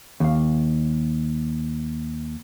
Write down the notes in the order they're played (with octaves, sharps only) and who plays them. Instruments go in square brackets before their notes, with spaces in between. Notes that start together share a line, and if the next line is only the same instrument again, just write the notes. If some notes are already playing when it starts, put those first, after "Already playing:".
[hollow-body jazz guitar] D#2 F5